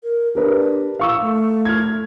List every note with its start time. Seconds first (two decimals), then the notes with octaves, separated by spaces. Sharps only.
0.03 A#4
0.35 D4 G4 A#4 B4
0.99 F5 C#6 E6
1.21 A3
1.65 F6 G#6